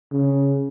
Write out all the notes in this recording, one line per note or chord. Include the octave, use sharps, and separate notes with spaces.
C#3